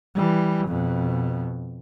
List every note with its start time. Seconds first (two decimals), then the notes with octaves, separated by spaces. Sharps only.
0.15 E3 G3
0.67 F2 B2